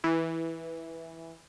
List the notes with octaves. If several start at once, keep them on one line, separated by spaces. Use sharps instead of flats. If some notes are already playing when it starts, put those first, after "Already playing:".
E3